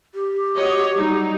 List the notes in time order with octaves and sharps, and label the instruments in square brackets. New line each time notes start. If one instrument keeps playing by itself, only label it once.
[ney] G4
[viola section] F#4 C#5 D#5
F#3 G3 D#4